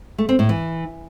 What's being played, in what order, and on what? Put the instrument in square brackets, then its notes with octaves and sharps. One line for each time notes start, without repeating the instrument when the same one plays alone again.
[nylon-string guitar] A3
C4
A2
E3